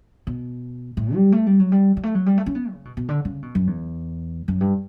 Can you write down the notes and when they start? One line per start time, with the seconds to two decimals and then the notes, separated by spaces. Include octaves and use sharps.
0.27 B2
0.97 A2
1.15 G3
1.32 A3
1.46 G3
1.60 F#3
1.72 G3
1.97 G3
2.03 A3
2.15 F#3
2.26 G3
2.38 A3
2.46 C#4
2.55 B3
2.72 C#3
2.85 B2
2.97 B2
3.09 D3
3.25 C#3
3.42 B2
3.55 F#2
3.67 E2
4.48 F#2
4.61 G2